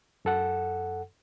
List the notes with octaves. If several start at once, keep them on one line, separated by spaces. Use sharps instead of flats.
F#2 A4 F#5